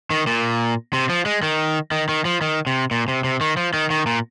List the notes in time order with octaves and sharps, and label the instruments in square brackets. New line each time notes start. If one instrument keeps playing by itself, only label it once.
[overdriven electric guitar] D#3
A#2
C3
F3
G#3
D#3
D#3
D#3
F3
D#3
C3
A#2
C3
C3
D#3
F3
D#3
D#3
A#2